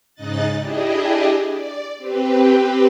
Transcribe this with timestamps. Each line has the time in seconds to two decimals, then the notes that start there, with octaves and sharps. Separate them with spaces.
0.14 G#2 C#3 D#4 D#5 F#6 A6
0.59 D4 E4 G4 G#4 D#5
1.46 D5
1.97 C4 G4 B4